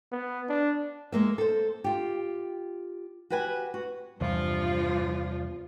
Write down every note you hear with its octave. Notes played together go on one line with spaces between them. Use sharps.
B3
D4
G#3 A#3 E5
A4 C5
F4 G4
F#4 G4 B4 F#5 G#5
F#4
E2 G2 C3 F3 G3 F4